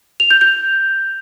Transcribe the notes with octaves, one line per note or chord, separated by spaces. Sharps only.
F7
G6
G6